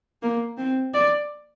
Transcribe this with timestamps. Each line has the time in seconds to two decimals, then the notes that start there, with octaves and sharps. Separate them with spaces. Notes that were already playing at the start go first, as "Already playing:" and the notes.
0.23 A#3
0.58 C4
0.94 D5